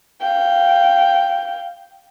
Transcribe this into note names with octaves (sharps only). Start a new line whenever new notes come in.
F5 G5